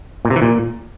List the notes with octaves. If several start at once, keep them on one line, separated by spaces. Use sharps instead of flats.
A#2
C3
E3
A#2